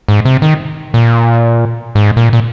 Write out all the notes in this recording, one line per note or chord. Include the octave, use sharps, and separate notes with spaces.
G#2
C3
D#3
A#2
G#2
A#2
A#2